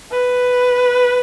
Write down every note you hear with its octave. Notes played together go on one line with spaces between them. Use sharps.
B4